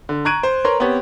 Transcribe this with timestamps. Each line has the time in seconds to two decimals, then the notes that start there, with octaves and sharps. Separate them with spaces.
0.09 D3
0.25 A#5 C#6 F#6 G#6 D7 D#7
0.43 C5
0.65 A#4 B4 C#5 A#5 C6
0.80 B3 C4 G4 C#5